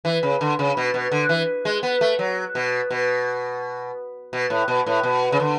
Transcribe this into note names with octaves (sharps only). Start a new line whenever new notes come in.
E3
C#3
D3
C#3
B2
B2
D3
E3
G#3
B3
A3
F#3
B2
B2
B2
A2
B2
A2
B2
C#3
D3